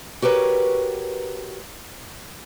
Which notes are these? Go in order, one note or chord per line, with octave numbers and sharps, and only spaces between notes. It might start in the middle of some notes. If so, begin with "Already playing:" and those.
F#4 G4 A#4 B4 C#5